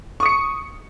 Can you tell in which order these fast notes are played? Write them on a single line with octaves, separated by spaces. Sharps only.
C#6 D#6 C#7